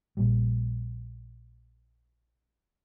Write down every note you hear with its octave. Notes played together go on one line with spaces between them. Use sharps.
A#1 A#2 G3